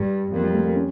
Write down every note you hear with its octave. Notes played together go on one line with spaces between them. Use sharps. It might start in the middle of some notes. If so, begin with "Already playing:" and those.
Already playing: G2 G3
F2 A#3
G3
A3
A#3
C#4